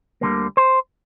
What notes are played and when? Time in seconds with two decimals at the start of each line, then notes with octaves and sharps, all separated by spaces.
0.21 D2 D3 G3 A#3
0.57 C5